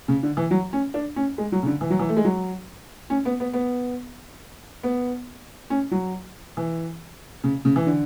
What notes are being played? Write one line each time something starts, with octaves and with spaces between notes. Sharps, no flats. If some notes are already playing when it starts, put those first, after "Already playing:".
C#3
D3
E3
F#3
C#4
D4
C#4
G#3
F#3
C#3
D3
E3
F#3
E3
A3
G#3
F#3
C#4
B3
B3
B3
B3
C#4
F#3
E3
C#3
C#3
E3
D3